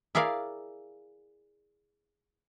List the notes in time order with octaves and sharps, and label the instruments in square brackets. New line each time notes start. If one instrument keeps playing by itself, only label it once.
[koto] E4 G#4 A#4 D5 F5